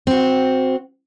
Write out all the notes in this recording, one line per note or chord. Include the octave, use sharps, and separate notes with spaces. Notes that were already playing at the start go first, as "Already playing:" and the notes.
C4 F#4